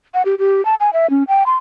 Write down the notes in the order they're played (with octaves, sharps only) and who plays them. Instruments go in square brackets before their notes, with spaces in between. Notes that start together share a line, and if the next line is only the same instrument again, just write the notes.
[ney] F#5
G4
G4
A5
G#5
E5
C#4
G5
C6